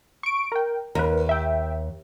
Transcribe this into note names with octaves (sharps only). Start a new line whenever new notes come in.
C#6 D7
A#4 G5
D#2 A#4 B4
E5 G5